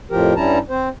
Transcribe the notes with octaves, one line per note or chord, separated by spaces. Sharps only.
F2 A2 F3 G4 A#4
G2 G3 C#4 E4 A5 A#5
C4 C5